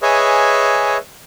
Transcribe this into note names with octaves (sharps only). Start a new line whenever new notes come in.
G#4 B4 C#5 D#5 E5 G#5